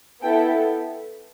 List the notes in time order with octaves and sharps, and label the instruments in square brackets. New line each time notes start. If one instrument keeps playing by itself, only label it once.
[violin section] B3 E4 A4 G5